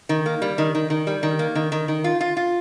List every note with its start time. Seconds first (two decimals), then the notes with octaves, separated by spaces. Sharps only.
0.09 D#3
0.26 A#3
0.42 G3
0.58 D#3
0.75 D#3
0.90 D#3
1.07 G3
1.23 D#3
1.39 A#3
1.55 D#3
1.72 D#3
1.88 D#3
2.04 F4
2.20 F4
2.37 F4